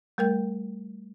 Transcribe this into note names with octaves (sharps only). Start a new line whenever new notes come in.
G3 A3 A#4 G5 G6